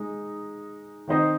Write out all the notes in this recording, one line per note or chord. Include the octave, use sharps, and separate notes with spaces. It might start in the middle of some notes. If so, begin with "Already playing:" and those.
Already playing: G#3 D#4
D#3 C4 D#4 C5 D#5